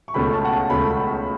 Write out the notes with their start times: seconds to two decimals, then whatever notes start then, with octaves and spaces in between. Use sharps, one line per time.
0.08 C#6
0.14 C#2 B2 A3 C#4 B5
0.33 A5
0.45 F#5
0.52 A5
0.65 A5
0.70 C#2 B2 A3 C#4 B5